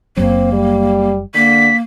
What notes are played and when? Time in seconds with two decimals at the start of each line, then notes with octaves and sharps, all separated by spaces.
0.17 F#1 F#2 F#3 A#3 C4
0.53 G3
1.35 D3 A#3 B6